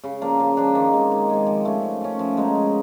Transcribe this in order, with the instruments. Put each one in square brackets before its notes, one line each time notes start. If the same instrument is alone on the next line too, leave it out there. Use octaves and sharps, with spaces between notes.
[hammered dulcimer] C#3
F3 A#3 D4
C#3
F3 A#3 D4
D#3
G#3 C4
D#3
G#3 C4
F3
A3 C#4
F3
A3 C#4
F3
G#3 B3 D#4
F3